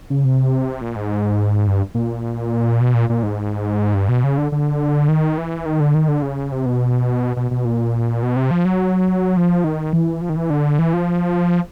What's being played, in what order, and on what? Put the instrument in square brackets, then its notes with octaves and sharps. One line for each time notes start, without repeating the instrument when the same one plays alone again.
[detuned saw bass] C#3
C3
A#2
G#2
G2
A#2
B2
A#2
A#2
G#2
G2
B2
C#3
D3
D3
D#3
E3
D#3
D3
D#3
D3
C#3
C3
B2
B2
B2
A#2
B2
C3
F3
F#3
F3
D#3
E3
F3
D#3
E3
D3
E3
F3